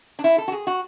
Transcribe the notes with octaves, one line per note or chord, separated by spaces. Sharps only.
D4
E4
A4
F#4
G#4
F#4